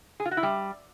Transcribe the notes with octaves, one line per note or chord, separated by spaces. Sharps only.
G#4
F4
F#4
E4
G3